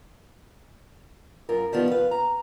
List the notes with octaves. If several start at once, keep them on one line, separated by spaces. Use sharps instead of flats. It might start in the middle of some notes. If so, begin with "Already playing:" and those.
F#2 F4 A#4
D#3 F3 G3 B3 F4
B4 F5
A#5